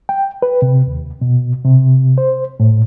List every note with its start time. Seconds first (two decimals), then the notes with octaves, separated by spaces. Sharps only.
0.09 G5
0.42 B4
0.62 C3
0.87 D#2
1.22 B2
1.65 C3
2.18 C5
2.60 A2